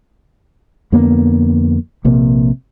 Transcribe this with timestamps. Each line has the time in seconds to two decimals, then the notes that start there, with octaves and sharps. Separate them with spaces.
0.92 F2 D3 A#3 B3
2.05 A#1 C3 A#3